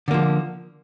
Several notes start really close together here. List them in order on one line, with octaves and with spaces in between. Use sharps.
D3 A#3 F3